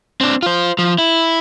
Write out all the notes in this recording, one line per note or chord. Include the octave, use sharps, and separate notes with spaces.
C4 D4
F4 C5
F3
E4